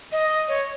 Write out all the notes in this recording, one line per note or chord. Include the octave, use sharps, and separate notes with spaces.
D#5
C#5